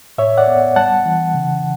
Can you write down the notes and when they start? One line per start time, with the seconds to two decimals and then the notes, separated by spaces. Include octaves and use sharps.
0.18 A2 C#5 E5
0.38 D5 F#5
0.48 B3
0.76 G3 F#5 A5
1.06 E3
1.34 C#3